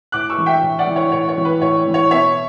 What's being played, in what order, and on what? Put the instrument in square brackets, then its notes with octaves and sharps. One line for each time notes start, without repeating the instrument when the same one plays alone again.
[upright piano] A2 D6 F#6
C#6 E6
E3
E5 G5
A2
D5 F#5
E3
C#5
A2 C#5
C#5
E3
B4
A2 C#5
E3
C#5
B2 C#5 E5